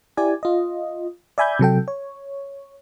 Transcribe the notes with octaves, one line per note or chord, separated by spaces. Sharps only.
E4 G4 D5 G#5
F4 D#5
D5 E5 G#5 B5 G6 G#6
C3 F#3 A4 G5
C#5